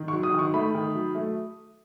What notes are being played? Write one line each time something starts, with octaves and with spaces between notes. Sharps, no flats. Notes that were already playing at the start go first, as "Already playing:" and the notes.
Already playing: D#3
C#6
F#3
D#6
D#3 C#6
A3 B5
D#3
F#3
A3